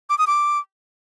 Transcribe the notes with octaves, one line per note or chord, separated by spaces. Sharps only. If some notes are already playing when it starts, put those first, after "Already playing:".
D6
D#6
D6